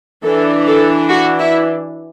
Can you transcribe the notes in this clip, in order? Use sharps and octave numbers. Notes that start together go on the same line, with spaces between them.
E3 D4 A4
A4
F#4
E4